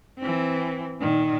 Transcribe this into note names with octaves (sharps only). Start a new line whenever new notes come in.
E3 C4
A#2 D#3